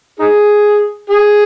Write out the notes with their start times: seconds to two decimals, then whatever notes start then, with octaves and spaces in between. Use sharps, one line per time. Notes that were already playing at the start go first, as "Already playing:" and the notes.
0.19 D#4 G#4
1.10 G#4